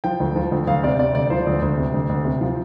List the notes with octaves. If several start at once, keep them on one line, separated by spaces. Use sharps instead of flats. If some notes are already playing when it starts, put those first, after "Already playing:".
F3 G5
D2
F3
D2
D2 F5
C3 D5
C3 D5
D2 D5
F3 C5
D2
D2
C3
D2
D2
C3
F3